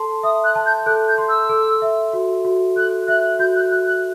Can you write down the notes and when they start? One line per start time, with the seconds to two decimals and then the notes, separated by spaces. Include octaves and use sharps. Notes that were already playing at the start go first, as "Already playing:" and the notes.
Already playing: A4 A5 C6
0.23 E5 D#6
0.44 F#6
0.55 A5
0.66 G6
0.86 A4 F#6
1.08 G6
1.18 C6
1.29 E6
1.49 A4
1.82 E5
2.13 F#4
2.45 F#4
2.76 A4 F#6
3.07 E5 F#6
3.39 F#4 G6
3.56 F#6
3.71 F#4 F#6
3.87 F#6